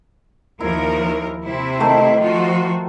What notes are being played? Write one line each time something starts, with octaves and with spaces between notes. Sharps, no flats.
D#2 F3 E4 A#4
C3 C4 E4
D#3 A3 G5
F3 F4 F#4